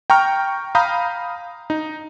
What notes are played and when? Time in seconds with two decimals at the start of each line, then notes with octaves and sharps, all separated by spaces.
0.10 G5 A#5 C#6 F6
0.75 F5 A#5 B5 D#6 G6
1.70 D#4